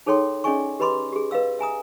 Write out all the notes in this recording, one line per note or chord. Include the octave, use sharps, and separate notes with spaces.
D#4 G#4 A4 C#5 G5 C6
C#4 G#4 D5 D#5 G#5 C#6
G4 B4 D#5 B5 C6 D6
G4 G#4
B4 D#5 F5 E6
E5 G#5 A#5 D#6